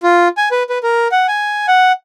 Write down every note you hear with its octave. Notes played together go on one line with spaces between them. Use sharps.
F4
G#5
B4
B4
A#4
F#5
G#5
F#5